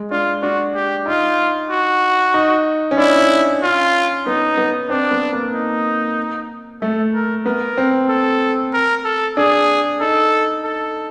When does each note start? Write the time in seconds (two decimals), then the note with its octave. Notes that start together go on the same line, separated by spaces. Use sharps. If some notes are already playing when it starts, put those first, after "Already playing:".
Already playing: G#3
0.11 D4 F4
0.42 D4 F#4
0.75 G4
1.06 D#4 F4
1.70 F#4
2.34 D#4
2.91 C#4
2.98 D4 E4
3.62 C#4 F4
4.26 B3 D#4
4.57 B3
4.89 C4 D4
5.11 B3
5.32 A#3
5.53 D#4
6.81 A3 A4
7.13 A#4
7.45 B3 A#4
7.77 C4
8.09 A4
8.73 A#4
9.04 A4
9.37 D4 G#4
10.00 D#4 A4
10.64 A4